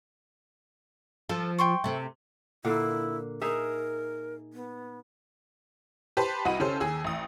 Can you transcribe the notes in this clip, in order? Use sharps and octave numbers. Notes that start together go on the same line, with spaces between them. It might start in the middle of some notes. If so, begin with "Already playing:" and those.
F3 F4 A4
G5 C6 C#6
C3 A3
A#2 D3 A#3 E4
D#4 G#4 A#4 E5
B3
G4 B4 C5 A5
C2 F#4 D#5 B5 D#7
C#3 C#4 G4 A4 C5
D#2 G#4 E6
A1 D#6